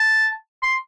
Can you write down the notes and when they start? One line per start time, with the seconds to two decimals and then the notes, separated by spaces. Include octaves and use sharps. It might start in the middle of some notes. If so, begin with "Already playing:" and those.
Already playing: A5
0.62 C6